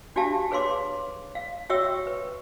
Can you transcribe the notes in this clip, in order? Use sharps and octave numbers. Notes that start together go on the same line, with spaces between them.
D4 F#4 G4 E5 F5 A5
G#4 B4 C#5 F5 C6 D6
F5
F#4 C#5 E5 G5 C#6 E6
B4